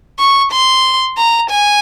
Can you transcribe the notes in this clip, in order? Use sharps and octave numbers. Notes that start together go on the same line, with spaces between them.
C#6
C6
A#5
G#5